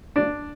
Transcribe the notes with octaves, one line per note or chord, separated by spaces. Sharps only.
D4